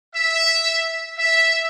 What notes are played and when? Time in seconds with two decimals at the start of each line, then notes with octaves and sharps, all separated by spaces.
0.14 E5
1.17 E5